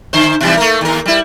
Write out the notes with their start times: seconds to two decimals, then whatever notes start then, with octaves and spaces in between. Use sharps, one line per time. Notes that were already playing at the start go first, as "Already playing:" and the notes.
0.13 D3 C5
0.41 B2 E3 G3
0.57 A3 A#3 A#4
0.81 D#2 A#4
1.06 G3 E4